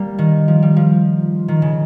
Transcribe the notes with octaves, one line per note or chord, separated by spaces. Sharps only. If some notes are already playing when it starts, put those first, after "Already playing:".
Already playing: G3 A#3
D#3
F3
G3
F3
D#3
C#3